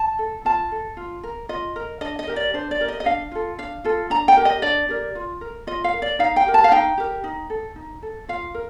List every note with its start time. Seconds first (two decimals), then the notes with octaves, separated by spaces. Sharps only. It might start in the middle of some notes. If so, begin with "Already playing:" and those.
Already playing: A5
0.19 A4
0.45 F4 A5
0.72 A4
0.97 F4
1.23 A#4
1.49 F4 D#5
1.76 A#4
2.01 D4 D#5
2.19 D#5
2.27 G4 A#4
2.36 D5
2.54 D4 C5
2.71 D5
2.80 G4 A#4
2.88 D#5
3.00 D#5
3.06 D4 F5
3.32 F4 A4
3.58 D4 F5
3.84 F4 A4
4.10 D4 A#5
4.28 G5
4.37 G4 A#4
4.45 D#5
4.62 D4 D5
4.89 G4 A#4
5.15 F4
5.41 A#4
5.67 F4 D#5
5.84 F5
5.94 A#4
6.02 D5
6.19 D#4 F5
6.36 G5
6.46 G4 A#4
6.54 A5
6.64 F5
6.71 D#4 G5
6.98 G4 A#4
7.24 D#4
7.50 A4
7.76 D#4
8.02 A4
8.28 F4 F5
8.54 A#4